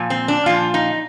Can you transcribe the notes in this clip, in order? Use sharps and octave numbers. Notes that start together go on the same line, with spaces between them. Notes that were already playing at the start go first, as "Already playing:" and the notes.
Already playing: A#2 F3
C4
D4
A#2 F3 F4
D#4